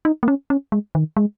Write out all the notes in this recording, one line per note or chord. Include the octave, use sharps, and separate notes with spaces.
D#4
A#3
C#4
C#4
G#3
D#3
G#3